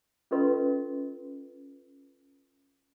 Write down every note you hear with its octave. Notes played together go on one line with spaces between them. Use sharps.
C#4 F4 A4 B4 D#5 C6